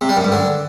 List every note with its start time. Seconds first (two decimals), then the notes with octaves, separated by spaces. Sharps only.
0.01 C3
0.09 G3
0.17 F#2
0.24 G2
0.32 D3